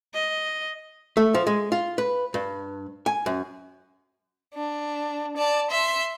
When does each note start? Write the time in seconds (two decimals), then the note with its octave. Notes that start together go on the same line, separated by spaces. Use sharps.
0.14 D#5
1.17 A3
1.34 F3
1.47 G#3
1.72 F4
1.98 B4
2.34 G2
3.06 G#5
3.26 F#2
4.55 D4
5.37 D5 A5
5.70 E5 C6